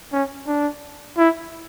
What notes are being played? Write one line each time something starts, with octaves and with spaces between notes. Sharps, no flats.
C#4
D4
E4